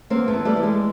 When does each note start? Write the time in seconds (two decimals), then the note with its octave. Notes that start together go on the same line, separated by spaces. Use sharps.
0.10 E2 A#3 C4
0.28 A3 B3
0.34 E3
0.45 G3 A3
0.57 E3
0.63 G#3